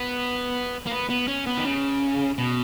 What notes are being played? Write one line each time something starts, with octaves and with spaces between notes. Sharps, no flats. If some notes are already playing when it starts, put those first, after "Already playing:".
Already playing: B3
A#3
B3
B3
C#4
B3
D#3
C#3
B2